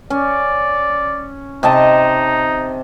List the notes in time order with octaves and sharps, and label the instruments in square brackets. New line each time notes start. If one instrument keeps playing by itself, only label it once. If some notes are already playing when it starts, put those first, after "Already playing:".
[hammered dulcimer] C#4 [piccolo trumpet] D5
[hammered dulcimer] C3 D#5 A5 [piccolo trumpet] D#4